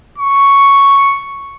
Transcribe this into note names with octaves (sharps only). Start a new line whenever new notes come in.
C#6